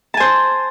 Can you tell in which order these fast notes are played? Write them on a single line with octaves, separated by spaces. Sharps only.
A5 G#5 C5